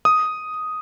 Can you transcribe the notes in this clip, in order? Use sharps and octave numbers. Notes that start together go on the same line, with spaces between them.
D#6